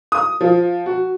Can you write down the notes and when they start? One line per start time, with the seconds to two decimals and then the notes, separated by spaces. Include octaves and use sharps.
0.12 D#6
0.41 F3
0.86 F#4